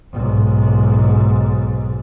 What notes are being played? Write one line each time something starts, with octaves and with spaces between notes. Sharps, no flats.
B1 G#2